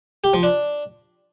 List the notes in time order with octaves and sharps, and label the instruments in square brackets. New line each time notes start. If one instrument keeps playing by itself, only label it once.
[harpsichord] G4
F3
D4